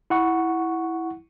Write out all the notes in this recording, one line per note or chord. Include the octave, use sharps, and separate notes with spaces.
E4 F#5 C#6